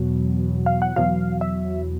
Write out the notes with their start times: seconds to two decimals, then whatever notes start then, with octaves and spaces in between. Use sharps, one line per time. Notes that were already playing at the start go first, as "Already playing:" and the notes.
Already playing: E2 B2 F#3
0.66 F5
0.82 F#5
0.96 E2 B2 F#3 F5
1.41 E5